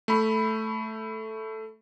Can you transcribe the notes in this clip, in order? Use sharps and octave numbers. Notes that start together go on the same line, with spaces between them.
A3 B5